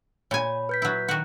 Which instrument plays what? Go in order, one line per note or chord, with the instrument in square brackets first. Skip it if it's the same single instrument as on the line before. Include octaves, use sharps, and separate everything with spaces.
[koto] A#2 G#5 [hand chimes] C#5 B5
[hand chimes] B4 G6 B6
[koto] F#3 E4
D#3 F#4